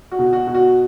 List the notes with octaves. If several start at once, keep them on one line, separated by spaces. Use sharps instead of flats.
F#4
B2
F#4
B2
F#4